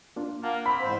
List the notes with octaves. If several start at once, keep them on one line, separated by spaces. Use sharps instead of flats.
A#3 D4 F4
A#3 F5 F#5 A5
C4 B5
E2 G#2 C5